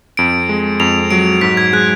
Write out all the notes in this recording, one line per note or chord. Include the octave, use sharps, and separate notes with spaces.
F2 D7
G#3
F2 F7
F#3 D7
G#2 B6
G#6
G#3 F#6